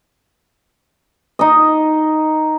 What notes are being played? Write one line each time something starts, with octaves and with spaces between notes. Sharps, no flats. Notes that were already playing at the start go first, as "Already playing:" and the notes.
D#4 D#5